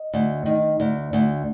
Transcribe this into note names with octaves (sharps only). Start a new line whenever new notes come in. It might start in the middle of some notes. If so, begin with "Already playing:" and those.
Already playing: D#5
D2
D#3
D2
D2